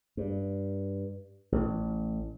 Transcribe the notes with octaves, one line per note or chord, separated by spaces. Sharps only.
G2
A1